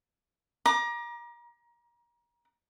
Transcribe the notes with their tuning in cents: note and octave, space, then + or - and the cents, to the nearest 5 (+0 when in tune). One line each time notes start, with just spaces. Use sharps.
A#5 +30 D6 +25